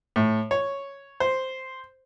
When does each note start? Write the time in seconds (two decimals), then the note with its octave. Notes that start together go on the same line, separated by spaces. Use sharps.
0.16 A2
0.51 C#5
1.20 C5